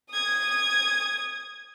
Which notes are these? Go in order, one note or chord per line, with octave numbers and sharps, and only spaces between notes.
D#6 G#6